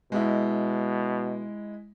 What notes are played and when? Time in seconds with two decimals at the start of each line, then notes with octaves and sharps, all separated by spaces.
0.12 B2 G#3 E4